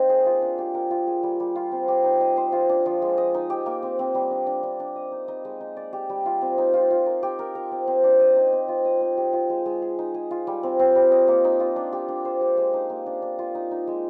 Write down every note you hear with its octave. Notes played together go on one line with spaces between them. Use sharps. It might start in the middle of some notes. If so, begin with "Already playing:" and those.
Already playing: A#3 C4 D#4
G#4
F4
D4
G4
A#4
F4
G#4
G3
G3
F4
C4
G4
D#4
D#5
C5
F4
D4
F3
G#3
D#5
D#4
G4
A#3
C4
C4
G3
D4
D4
D4
D4
D#5
D#4
D#4
G#3
D#4
D5
G4
G3
F4
C4
D#4
F4
F4
A#4
G4
A#4
A#4
C4
C4
D4
D#5
D#4
C4
F4
D#5
C4
G4
F4
G#3
G#3
G#4
D#4
G#4
F4
G3
C4
C4
G3
D#5
A#3
D#4
F4
D4
G4
D4
C5
G4
G#3
D#4
A#3
D4
D4
F4
D#4
D#4
G#3